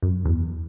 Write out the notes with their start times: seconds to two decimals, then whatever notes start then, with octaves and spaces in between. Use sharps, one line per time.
0.02 F#2
0.25 E2